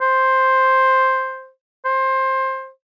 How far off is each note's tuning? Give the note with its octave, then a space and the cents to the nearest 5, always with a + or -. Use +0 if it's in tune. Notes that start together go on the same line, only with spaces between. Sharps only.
C5 +5
C5 +20